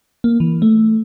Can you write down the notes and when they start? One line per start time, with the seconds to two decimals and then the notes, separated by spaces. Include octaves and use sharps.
0.24 A#3
0.40 E3
0.62 A3